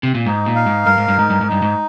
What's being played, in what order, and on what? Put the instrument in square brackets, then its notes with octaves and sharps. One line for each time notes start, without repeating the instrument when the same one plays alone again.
[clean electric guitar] C3
A#2
[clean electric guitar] G#2 [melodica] D#4
[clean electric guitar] A#2
[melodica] F5
[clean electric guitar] G#2
[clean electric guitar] G2 [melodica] A#4
[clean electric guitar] G#2
G2
[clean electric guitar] G#2 [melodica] D#4
[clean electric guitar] G2
G#2
[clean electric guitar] G2 [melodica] D#4
[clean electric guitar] G#2